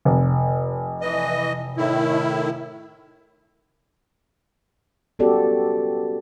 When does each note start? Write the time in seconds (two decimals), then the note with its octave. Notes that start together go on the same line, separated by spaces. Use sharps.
0.05 F1
1.01 E3 D#5
1.77 A2 D#3 E4
5.19 B3 C#4 F#4 G4 A4 D5